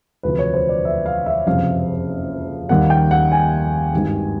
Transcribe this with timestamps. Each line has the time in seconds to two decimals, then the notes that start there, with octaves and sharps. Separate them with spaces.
0.23 E1 D2 C3 F3 B4
0.39 C#5
0.54 C5
0.69 D5
0.85 E5
1.06 F5
1.26 E5
1.47 F#1 F2 C3 F5
2.69 D#2 D#3 G3 A#3 F#5
2.90 G5
3.11 F#5
3.32 G#5
3.93 G#1 G2 D#3 G3